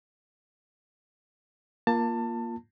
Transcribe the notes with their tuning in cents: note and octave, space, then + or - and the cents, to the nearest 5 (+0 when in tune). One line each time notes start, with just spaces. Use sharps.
A#3 +10 F4 +0 A5 +25